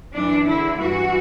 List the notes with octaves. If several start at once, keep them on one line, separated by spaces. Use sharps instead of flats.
F#2 E3 D4
E2 D3 E4
G2 E3 F#4